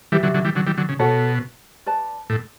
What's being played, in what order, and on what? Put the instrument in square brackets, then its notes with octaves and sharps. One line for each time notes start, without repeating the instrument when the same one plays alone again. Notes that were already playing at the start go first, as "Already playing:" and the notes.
[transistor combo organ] E3 G3 [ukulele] G4 B4 E5
[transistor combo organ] D3 F#3
D3 F#3
E3 G3
D3 F#3
E3 G3
D3 F#3
C#3
[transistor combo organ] B2 [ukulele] F#4 A4 C#5 F#5
[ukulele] B4 D5 A5
[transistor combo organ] A2